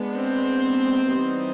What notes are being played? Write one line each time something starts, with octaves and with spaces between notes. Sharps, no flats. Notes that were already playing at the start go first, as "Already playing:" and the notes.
Already playing: G#3 B3 D4
C4 C5
E3 G3 B3 D#4